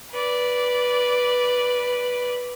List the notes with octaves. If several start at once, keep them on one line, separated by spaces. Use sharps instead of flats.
B4 D5